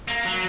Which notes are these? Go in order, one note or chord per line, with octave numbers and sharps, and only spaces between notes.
A#3
F#3